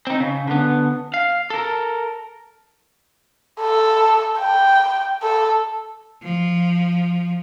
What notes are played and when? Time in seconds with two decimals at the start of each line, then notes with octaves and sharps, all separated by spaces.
0.07 C4 D#4
0.20 C#3
0.47 D3 B3
1.14 F5
1.50 A4 A#4
3.61 A4
4.39 G5
5.22 A4
6.23 F3